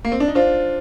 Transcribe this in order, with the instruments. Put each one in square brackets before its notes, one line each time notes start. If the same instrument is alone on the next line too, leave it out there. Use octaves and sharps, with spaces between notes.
[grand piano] A#3
C4
D4
D#4
[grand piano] D4 F4 [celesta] C5